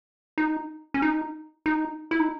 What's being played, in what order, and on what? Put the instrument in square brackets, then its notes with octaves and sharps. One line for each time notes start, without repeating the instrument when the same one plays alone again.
[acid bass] D#4
C#4
D#4
D#4
E4
D#4